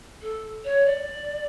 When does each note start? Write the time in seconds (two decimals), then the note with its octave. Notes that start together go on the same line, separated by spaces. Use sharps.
0.21 A4
0.64 C#5
0.85 D5